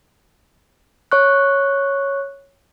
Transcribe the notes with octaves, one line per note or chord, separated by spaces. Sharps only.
C#5 C#6 F#6